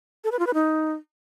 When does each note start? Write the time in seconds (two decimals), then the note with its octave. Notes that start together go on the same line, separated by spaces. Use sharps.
0.24 A4
0.32 B4
0.39 F4
0.47 B4
0.54 D#4